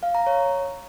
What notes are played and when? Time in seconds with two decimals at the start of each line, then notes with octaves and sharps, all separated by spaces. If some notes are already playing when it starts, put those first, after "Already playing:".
0.03 F5
0.15 A#5
0.27 C#5